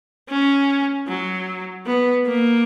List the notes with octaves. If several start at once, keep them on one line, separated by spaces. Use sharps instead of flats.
C#4
F#3
B3
A#3